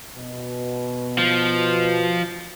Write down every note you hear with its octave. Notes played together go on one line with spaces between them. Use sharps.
B2
F3